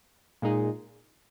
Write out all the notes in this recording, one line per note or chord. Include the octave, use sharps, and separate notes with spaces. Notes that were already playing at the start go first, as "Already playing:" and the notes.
A#2 G#3 D#4 G#4